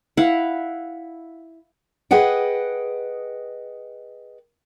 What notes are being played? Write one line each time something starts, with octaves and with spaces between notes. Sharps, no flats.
E4 F5 F#5
G#4 B4 D#5 F#5 G5